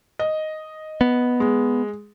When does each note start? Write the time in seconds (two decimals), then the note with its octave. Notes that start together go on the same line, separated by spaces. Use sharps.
0.19 D#5
1.01 B3
1.40 G#3